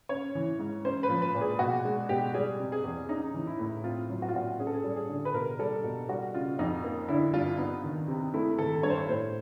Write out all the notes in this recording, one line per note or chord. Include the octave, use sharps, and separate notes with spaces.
C#4 C#5
E3
G#2
C#4 C5
B4
F3
B4
A#2
G#4
B2 F#4
G#3
B2 G4
G3 G#4
C3
G#4
E2
C#4 D#4
E3
E4
A2
C4 F4
F#3
F#4
F4
A#2 F#4
C#4 G#4
A4
G#4
G3
G#4
D3
B4
B2 A#4
G3 A4
B2
G3 F#4
C#3 F4
F2 D#4
A#3
D3 E4
G2 F4
B3 D#4
D#3
C3
A3 E4
D#3 A4
G2 C#5
C5
C#5
A2 C5